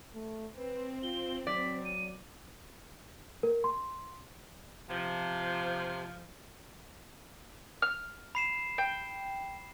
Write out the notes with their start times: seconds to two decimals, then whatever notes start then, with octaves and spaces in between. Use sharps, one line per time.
0.14 A3
0.57 C4 B4
1.03 F4 G7
1.47 F#3 D5 B6
1.85 D#7
3.43 A#4
3.64 C6
4.89 C3 F3
7.82 F6
8.35 B5 C7 E7
8.78 G5